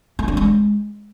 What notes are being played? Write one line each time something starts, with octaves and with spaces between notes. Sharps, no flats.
A3
D4
G#3